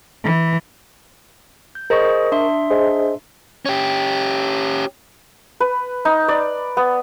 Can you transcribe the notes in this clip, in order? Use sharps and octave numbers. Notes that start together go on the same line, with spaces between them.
E3
G6
G#4 A#4 C5 D#5 C#6
D4 E5 C6
G#4 C5 D#5
C#4 G4
B4
D#4
D5
B3